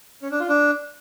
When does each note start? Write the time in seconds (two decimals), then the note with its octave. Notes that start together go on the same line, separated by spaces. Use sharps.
0.22 C#4
0.31 D4
0.40 F4
0.49 D4